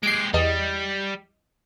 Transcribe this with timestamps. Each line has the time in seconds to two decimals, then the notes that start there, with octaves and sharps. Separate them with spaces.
0.03 G#3 G4 C7 D7
0.34 E2 G3 D#5